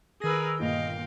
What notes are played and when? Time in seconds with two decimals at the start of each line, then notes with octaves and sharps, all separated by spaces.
0.22 D#3 G#4 A#4 B4 E6 A#6
0.59 G1 A#2 D#5 F5 G5 F7